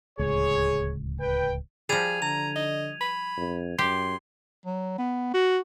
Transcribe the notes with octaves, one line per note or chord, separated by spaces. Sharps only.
D1 C#2 G#4 C#5
B4 G5
F3 G3 G#4 G#6 D#7 F7
D3 A#5 F7
D#5
B5
F2
F#2 G4 C6
F#3
B3
F#4